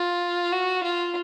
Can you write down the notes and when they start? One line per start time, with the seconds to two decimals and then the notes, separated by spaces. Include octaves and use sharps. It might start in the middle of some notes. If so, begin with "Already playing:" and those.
Already playing: F4
0.52 F#4
0.83 F4